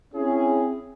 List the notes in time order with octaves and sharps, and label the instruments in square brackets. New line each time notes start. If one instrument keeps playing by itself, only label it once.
[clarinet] C4 [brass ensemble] C#4 E4 G#4